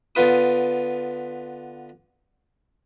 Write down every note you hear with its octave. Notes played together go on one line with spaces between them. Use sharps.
D3 B3 F4 B4 D#6